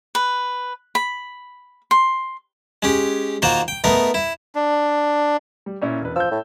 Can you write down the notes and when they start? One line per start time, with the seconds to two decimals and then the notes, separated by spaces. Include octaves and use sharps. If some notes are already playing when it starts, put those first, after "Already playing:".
0.15 B4
0.95 B5
1.91 C6
2.83 G#3 C#4 G4
3.42 D#3 A#3 F4 F#4 C5
3.68 G5
3.84 A3 B3 D#4 A#4
4.14 E4
4.55 D4
5.66 G3
5.82 A#2 C#4 E4
6.01 E1 B4
6.16 F3 E6 G6
6.31 A2